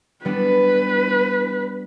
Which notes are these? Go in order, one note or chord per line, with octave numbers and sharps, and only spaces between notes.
G3 B3 D4 B4